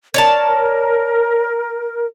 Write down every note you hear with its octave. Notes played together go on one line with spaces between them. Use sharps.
A#4 C#5 D5 A5